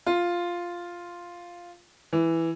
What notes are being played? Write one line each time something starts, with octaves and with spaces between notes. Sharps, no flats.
F4
E3